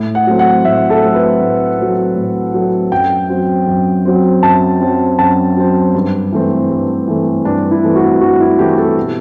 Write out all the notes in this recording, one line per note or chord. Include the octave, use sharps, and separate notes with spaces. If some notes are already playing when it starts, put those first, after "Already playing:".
Already playing: A2
F#5
F#3 A3 C4
F#5
A2 E5
A4
F#3 A3 C4
B4
A2
F#3 A3 C4
A2
F#3 A3 C4
F#2 G5
F#3 C4
F#2
F#3 C4
F#2 A5
F#3 C4
F#2 A5
F#3 C4
G2
E3 A3 C4
G2
E3 A3 C4
G2 D4
E4
E3 A3 C4
F#4
G2 F#4
E4
E3 A3 C4 G4
G4
A4
B2